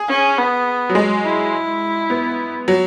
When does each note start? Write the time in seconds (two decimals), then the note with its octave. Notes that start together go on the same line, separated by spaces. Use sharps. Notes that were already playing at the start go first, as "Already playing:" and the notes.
Already playing: G#4
0.08 C#4
0.38 B3
0.90 F#3
0.95 G#3
1.24 E4
2.10 B3
2.68 F#3